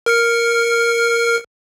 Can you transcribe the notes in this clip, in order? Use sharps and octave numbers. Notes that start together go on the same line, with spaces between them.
A#4 F6 C#7